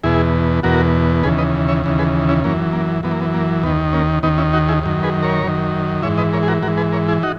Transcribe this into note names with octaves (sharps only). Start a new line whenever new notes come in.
E2 B2 E4 G#4
E2 B2 F#4 A#4
D#2 C#3 E3 G#4 B4
B4 D#5
C#5 E5
D#2 C#3 E3
G#4 B4
C#4 E4
F#2 E3 A#3 C#4
A#3
F#2 E3 B3
A#3
B3
A#3
D#2 D#3 B3
A#3 C#4
D#2 D#3 B3 D#4
C#4 E4
D#4 F#4
E4 G#4
F#2 D#3
G#4 B4
A#4 C#5
F#2 D#3
G#2 E3 C#5 E5
B4 D#5
A#4 C#5
G#4
F#4 A#4
G#2 F#4 A#4
E3
G#4 B4
A#4 C#5
E4 G#4
D#4 F#4